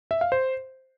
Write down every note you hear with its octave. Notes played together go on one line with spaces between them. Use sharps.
E5
F5
C5